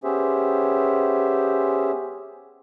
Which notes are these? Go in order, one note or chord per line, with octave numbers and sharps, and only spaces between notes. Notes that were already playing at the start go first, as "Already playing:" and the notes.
B3 C#4 G4 G#4 C5 E5